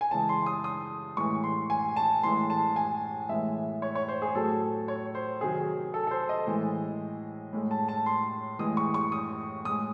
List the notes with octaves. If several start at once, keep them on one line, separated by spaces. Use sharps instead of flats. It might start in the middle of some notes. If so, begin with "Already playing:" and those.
G#5
C#3 E3 G#3 A5
C6
D#6
D#6
A2 E3 G#3 C#6
C6
G#5
A5
A2 E3 G#3 C6
A5
G#5
A2 E3 G#3 E5
C#5
C#5
C5
G#4
A2 F#3 A4
C#5
C5
C3 D#3 F#3 G#4
A4
A4
C5
D#5
A2 E3 G#3
A2 G#3
A5
A5
C6
A2 E3 G#3 D#6
C#6
C#6
D#6
A2 G#3 D#6